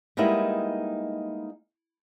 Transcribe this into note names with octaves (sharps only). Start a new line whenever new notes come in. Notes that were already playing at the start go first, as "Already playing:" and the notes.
G3 G#3 A#3 B3 D#4 E4